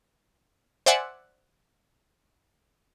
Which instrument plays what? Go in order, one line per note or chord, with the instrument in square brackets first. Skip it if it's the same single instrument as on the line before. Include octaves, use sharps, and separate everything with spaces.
[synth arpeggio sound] C5 D5 E5 F#5 G#5